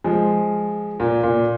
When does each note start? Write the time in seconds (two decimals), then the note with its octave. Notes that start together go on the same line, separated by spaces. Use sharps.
0.04 F3 G#3
1.00 A#2
1.23 A#2